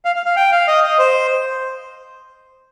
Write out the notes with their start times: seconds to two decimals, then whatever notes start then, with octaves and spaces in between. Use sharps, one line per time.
0.05 F5
0.16 F5
0.26 F5
0.37 G5
0.52 F5
0.68 D#5
0.84 D#5
0.99 C5